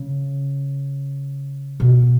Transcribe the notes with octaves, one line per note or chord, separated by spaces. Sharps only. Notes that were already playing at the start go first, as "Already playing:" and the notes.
Already playing: C#3
B2